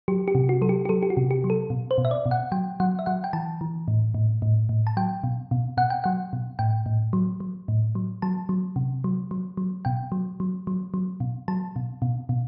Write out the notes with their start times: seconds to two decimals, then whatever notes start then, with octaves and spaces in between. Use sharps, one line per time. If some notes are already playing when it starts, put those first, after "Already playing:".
0.08 F#3 G4
0.28 G4
0.35 C3
0.49 F#4
0.62 F#3 A4
0.69 G4
0.85 G4
0.89 F#3 A4
1.03 G4
1.10 F#4
1.17 C3
1.31 G4
1.44 F#3
1.50 A4
1.70 B2
1.91 C5
1.98 B2
2.05 E5
2.11 D5
2.26 B2
2.31 F#5
2.52 F#3 G5
2.80 F#3 F#5
2.99 E5
3.06 F#3 F#5
3.24 G5
3.33 E3 A5
3.61 E3
3.88 A2
4.14 A2
4.42 A2
4.69 A2
4.87 A5
4.97 F#3 G5
5.24 B2
5.51 B2
5.77 B2 F#5
5.90 G5
6.04 F#3 F#5
6.33 B2
6.59 A2 G5
6.86 A2
7.13 F#3
7.40 F#3
7.68 A2
7.95 F#3
8.22 F#3 A5
8.49 F#3
8.76 C3
9.04 F#3
9.31 F#3
9.57 F#3
9.85 B2 G5
10.12 F#3
10.40 F#3
10.67 F#3
10.94 F#3
11.20 B2
11.48 F#3 A5
11.76 B2
12.02 B2
12.29 B2